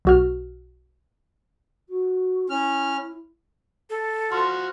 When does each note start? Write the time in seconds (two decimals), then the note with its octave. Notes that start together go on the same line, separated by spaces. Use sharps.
0.05 B1 F#4 F6
1.88 F#4
2.50 C#4 E4 F6
3.90 A4
4.32 F3 F#4 C6 F6